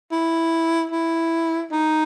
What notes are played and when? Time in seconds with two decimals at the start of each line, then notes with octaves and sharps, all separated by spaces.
0.11 E4
0.92 E4
1.72 D#4